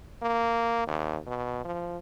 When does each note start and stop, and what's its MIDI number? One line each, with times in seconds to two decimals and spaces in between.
0.22 0.83 58
0.87 1.17 39
1.27 1.60 47
1.64 1.97 53